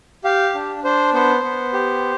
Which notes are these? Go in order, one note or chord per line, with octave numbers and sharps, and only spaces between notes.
G4 F5
D4
D4 C5
B3 C5
B3
G4